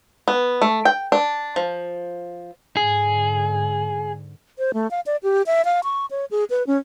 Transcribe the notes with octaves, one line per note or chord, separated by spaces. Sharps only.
B3
A3
G5
D4
F3
G#2 D3 G#4
C5
A3
F5
D5
G4
E5
F5
C#6
C#5
G#4
B4
C#4